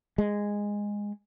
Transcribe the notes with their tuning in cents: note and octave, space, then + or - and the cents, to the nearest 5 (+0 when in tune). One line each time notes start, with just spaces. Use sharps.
G#3 -10